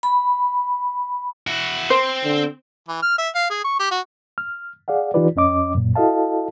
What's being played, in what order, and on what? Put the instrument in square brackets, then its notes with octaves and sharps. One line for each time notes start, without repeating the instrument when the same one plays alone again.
[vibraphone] B5
[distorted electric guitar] E4 F#4
[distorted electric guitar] C4 [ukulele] C5
[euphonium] D3
[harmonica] E3
F6
E5
F5
G#4
C#6
G4
F#4
[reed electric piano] F6
G#4 D5 F5 F#5
E3 D#4 F4 G4 B4 D5
F2 C#4 D#5 D6
F#2 A#2
E4 F#4 A4 D#5 F5 A5